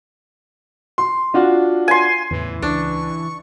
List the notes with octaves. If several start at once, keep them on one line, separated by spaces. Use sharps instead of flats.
C6
D4 F4 F#4
G#5 C6
E2 A2 C#3 E3
C#2 D4 C#6